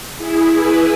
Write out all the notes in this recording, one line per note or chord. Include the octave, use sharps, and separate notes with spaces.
E4 G#4
G#4 B4